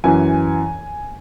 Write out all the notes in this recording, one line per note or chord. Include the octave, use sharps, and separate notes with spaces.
F#2 E3 G#5